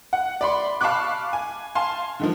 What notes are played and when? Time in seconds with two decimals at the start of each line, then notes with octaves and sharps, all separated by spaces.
0.13 F#5
0.41 D5 B5 C6
0.81 F5 A5 B5 C#6 D6 F#6
1.33 G#5
1.75 F5 G#5 A5 C6
2.20 D3 D#3 F3